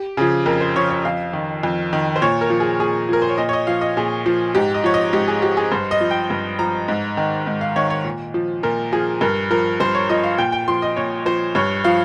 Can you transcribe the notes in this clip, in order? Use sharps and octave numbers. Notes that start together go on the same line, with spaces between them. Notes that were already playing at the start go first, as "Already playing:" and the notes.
Already playing: G4
C#3 F3 G#4
F2 A#4
C5
C#3 F3 C#5
C#5
F2 F5
D#3
F2
D#3
C5
A#2 C#5
A#4
F3
G#4
A#2 G#4
F3 A#4
C5
C#5
A#2 D#5
C#5
D#5
F3 F5
D#5
A#2 G#4
F3
G#2 G4
D#5
F3 C#5
D#5
G#2 G4
G#4
F3 G4
G#4
G2 C5
D#5
F3
G5
G2
F3 A#5
G#2
D#3
G#2
F5
D#3 C#5
C#5
A#2
F3
A#2 A#4
F3 G#4
G2 A#4
F3 A#4
G2 C5
C#5
F3 D#5
F5
A#2 G5
G5
F3 C6
D#5
A#2 C#5
F3 C5
G2 C#5
F3 F5